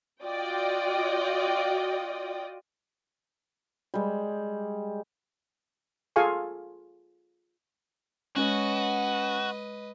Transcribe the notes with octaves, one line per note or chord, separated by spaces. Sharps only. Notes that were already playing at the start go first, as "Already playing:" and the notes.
F4 F#4 D5 D#5 G5 D#6
G3 G#3
F4 G#4 A4 F5 G#5 C#6
G#3 C#4 F#4 B4 C#5 D#5